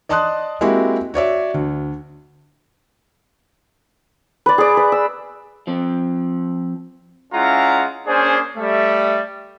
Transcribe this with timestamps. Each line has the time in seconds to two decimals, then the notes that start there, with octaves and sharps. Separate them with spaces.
0.09 D5 D#5 A5 C6 D#6 F#6
0.61 G#3 A#3 C4 E4 F#4 G4
1.14 F#4 C#5 D5 E5
1.54 D2
4.46 B4 D5
4.58 G#4 D5
4.77 B4
4.92 E6
5.67 F3 C4
7.33 G#3 C#4 E4 F4 F#5 A#5
8.07 A#3 C#4 D4 G#4 C5
8.57 G3 A3 E5